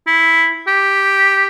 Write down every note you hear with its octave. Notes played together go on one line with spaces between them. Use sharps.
E4
G4